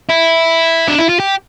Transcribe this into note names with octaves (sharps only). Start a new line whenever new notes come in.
E4
D4
E4
F4
G4